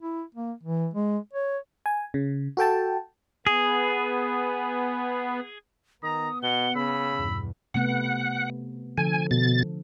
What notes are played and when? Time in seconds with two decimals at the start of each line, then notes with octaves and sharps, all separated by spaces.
0.02 E4
0.35 A#3
0.63 E3
0.94 G#3
1.33 C#5
1.86 G#5
2.14 C#3
2.57 F#4 A4 G5 A5
3.47 B3 G#4
6.03 D#3 B3 A#5 D#6
6.43 B2 F#5 G7
6.75 C#3 B5 E6
7.17 E2 G2 B2
7.74 C3 A3 B3 F#5
8.98 D3 F3 A4 G#5
9.31 B2 A6